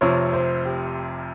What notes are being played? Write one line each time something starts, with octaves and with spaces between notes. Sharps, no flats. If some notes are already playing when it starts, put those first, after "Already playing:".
F1 F2 C3 F3 C#5
C5
G4